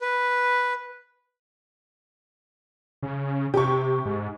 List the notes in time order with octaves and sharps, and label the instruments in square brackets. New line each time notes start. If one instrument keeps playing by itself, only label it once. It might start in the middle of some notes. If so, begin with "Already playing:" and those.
[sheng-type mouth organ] B4
[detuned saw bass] C#3
[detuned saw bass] C3 [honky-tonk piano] G4 C#6
[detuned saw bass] G#2